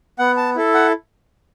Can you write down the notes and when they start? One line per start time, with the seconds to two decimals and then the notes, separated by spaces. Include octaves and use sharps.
0.19 B3 F#5
0.37 A5
0.56 E4 A4
0.74 F#5